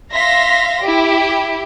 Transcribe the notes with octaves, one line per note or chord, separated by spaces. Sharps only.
E5 F5 C6 A#6 B6
E4 G4